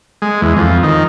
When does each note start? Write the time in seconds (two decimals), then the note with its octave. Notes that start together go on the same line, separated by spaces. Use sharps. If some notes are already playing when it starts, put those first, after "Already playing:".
0.22 G#3
0.42 E2
0.56 F2
0.83 D#3